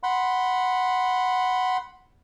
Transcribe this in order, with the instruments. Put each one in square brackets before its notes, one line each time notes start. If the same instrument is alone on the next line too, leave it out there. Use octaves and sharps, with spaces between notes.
[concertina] F#5 B5 C6